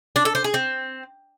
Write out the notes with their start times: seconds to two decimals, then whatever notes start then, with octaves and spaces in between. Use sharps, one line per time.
0.16 D4
0.25 A4
0.35 C5
0.44 G#4
0.54 C4